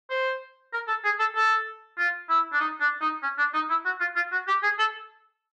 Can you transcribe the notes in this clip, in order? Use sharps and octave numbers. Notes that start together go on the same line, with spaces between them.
C5
A#4
A4
G#4
A4
A4
F4
E4
D4
D#4
D4
D#4
C#4
D4
D#4
E4
F#4
F4
F4
F#4
G4
G#4
A4